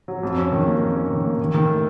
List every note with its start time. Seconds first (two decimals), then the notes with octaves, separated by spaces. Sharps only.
0.08 F#3
0.23 F2
0.38 C#4
0.52 D#3
0.67 A#3
0.80 F2
0.96 C#4
1.10 D#3
1.25 A#3
1.39 D#3
1.54 D#3
1.69 A3